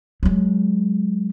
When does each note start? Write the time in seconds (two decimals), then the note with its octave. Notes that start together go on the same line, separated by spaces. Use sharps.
0.23 F#3 G#3